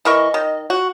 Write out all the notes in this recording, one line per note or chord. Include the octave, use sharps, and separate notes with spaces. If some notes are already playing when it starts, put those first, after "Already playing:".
E3 A#4 D#5 C#6
D#3
F#4